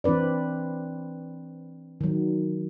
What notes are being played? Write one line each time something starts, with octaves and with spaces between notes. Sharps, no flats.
E3 C4 D4 B4 D5
D#3 F#3